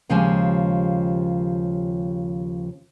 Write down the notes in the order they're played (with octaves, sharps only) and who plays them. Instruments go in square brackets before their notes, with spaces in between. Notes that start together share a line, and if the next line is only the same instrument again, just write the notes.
[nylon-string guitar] D#2 C#3 F3 G3 G#3 G#5